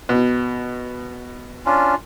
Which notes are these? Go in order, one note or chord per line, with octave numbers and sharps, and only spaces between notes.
B2
C#4 D4 F4